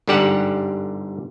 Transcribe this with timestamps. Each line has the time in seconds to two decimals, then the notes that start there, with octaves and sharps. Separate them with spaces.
0.07 G1 G#2 D3 G3 G4 F#5